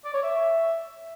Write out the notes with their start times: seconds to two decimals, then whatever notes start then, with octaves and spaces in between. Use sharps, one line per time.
0.05 D5
0.14 C#5
0.23 E5